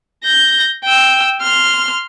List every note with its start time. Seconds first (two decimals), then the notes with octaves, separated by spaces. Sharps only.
0.24 G6 A#6
0.84 G5 E6
1.42 C6 F6